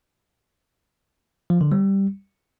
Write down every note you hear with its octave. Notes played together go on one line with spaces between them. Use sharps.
F3
D3
G3